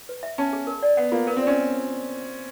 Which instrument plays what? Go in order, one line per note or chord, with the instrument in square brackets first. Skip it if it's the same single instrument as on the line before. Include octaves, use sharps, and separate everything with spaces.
[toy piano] B4
E5
[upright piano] C#4 [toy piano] A5
[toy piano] G#4
A#4
D5
[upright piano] B3 [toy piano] F#5
[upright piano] A#3 [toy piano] F4
[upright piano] B3 [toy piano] A#4
[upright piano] C4
[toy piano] D5
[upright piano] C#4